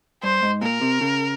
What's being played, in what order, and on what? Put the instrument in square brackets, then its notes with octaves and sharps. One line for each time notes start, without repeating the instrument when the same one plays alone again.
[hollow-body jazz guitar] G2 [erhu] C5
[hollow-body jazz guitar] G#2
[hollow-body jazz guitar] A#2 [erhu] A#4
[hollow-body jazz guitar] C3
C#3